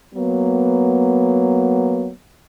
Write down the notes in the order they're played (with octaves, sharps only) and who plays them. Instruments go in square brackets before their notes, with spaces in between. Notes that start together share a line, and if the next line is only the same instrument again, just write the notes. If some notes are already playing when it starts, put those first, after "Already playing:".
[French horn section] F#3 A#3 B3